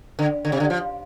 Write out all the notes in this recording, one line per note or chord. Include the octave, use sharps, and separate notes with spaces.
D3
D3
C3
D3
F3